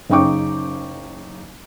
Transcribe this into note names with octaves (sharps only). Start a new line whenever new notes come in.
F#1 C#3 D#4 G5 C#6 D6